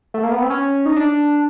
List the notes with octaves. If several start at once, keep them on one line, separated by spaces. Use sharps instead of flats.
A3
A#3
B3
C4
C#4
D#4
D4